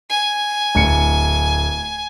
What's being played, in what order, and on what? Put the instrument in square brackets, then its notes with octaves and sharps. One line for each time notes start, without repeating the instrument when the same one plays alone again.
[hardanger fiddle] G#5
[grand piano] D1 C#7